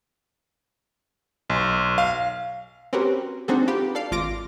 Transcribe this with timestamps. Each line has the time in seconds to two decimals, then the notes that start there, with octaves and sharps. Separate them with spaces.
1.50 B1
1.98 F5
2.93 C4 C#4 F#4 G4 A#4 B4
3.48 C4 D4 D#4 F#4 G#4 A4
3.67 F4 G4 B4
3.95 A4 D5 F5
4.11 G#1 F4 D6 A#6 D7